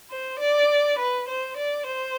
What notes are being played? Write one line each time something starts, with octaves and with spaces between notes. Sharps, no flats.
C5
D5
B4
C5
D5
C5